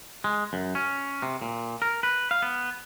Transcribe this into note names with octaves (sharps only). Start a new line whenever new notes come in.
G#3
F#2
C#4
C3
A#2
A#4
B4
F5
B3